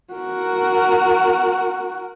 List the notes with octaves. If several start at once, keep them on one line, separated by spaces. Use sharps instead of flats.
F#4 A#4